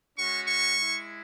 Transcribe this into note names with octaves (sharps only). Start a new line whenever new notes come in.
G#3 C#4 F#4 C#6
C#6
G#3 E4